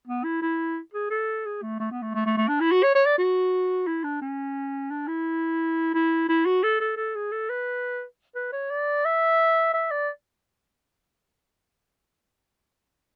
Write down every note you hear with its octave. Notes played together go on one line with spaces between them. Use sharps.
B3
E4
E4
G#4
A4
G#4
A3
A3
B3
A3
A3
A3
A3
D4
E4
F#4
C#5
C#5
D5
F#4
E4
D4
C#4
D4
E4
E4
E4
F#4
A4
A4
A4
G#4
A4
B4
B4
C#5
D5
E5
E5
D5